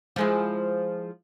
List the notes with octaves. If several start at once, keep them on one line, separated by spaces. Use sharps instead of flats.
F3 G#3 E4